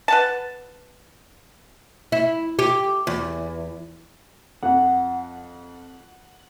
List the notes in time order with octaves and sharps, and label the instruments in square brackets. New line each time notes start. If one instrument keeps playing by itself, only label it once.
[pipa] B4 F#5 A5
[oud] E4
G4
E2
[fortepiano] F2 [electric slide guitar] F#5